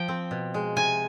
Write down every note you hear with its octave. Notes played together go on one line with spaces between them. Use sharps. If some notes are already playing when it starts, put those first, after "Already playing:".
Already playing: F3 G5
C4
B2
G#3
C3 G#5